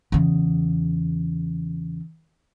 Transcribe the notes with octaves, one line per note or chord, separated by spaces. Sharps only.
E2 C#3